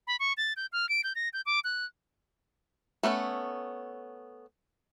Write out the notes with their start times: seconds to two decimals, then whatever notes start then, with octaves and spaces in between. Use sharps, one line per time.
0.07 B5
0.20 C#6
0.37 A6
0.57 G6
0.72 F6
0.89 D7
1.04 G6
1.15 A#6
1.33 G6
1.46 D6
1.64 F#6
3.03 A3 B3 C#4 A4